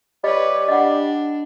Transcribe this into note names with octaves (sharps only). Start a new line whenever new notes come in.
G3 B4 C#5 D#5
D4 D#5 F#5